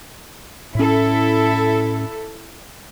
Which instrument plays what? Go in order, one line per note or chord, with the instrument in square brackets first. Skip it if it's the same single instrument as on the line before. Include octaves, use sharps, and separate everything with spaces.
[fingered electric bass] A2 C#4 [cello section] E4 A4